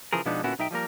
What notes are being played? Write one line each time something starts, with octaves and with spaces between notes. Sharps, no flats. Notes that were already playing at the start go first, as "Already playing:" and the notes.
C#3 E3 F3 G#4 A#4
B2 F3 G#3 B3 D4 D#4
A#2 D3 B3 C#4 E4 F#4
B1 D#4 E5 G5
F3 G3 A#3 A#4